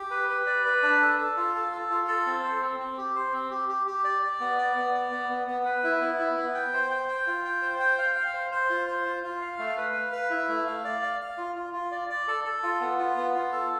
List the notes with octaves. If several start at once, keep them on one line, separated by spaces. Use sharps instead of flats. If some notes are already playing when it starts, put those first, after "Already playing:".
Already playing: G4
B4
B4
D5
B4
D4
A4
A4
F4
A4
A4
F4
A4
C4
C5
C4
C4
G4
C5
C4
G4
G4
G4
D5
D5
B3
D5
B3
D5
B3
B3
B3
B4
E4
B3
E4
B3
G5
C5
G5
G5
F4
G5
C5
G5
F5
F5
C5
C5
F4
C5
F4
F4
F5
A3
B4
F5
B4
E4
A3
F5
D5
F5
F5
F4
F4
F4
D5
D5
A4
A4
F4
B3
F4
B3
F4
A4